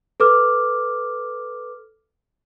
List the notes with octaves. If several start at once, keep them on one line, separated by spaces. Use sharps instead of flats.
A4 B4 D6 F6